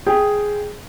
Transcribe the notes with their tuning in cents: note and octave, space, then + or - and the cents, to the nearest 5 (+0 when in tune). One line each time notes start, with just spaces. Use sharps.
G#4 +0 G5 +0